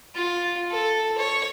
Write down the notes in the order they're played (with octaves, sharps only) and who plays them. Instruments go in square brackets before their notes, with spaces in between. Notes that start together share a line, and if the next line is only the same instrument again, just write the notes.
[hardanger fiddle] F4
A4
C#5